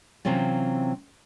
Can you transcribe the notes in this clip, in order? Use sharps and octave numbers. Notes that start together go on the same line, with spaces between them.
C3 E3 F#3 C4 C#4 F4